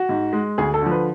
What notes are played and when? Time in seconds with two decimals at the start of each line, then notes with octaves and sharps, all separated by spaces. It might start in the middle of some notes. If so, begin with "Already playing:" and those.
Already playing: F#4
0.09 G#2
0.33 G#3
0.58 D2 G#4
0.74 A4
0.82 D3 F3
0.91 B4